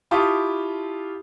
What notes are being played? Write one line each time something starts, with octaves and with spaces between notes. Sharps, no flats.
E4 F4 G4 A5 C#6 D#6